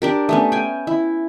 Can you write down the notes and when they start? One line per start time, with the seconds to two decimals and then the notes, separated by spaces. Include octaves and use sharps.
0.02 D4 G4 A#4
0.29 A3 B3 C#4
0.52 G5 G#5
0.87 E4